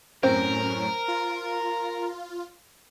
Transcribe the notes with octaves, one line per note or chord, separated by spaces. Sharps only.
F#2 A2 C4 C#4 A#4
F4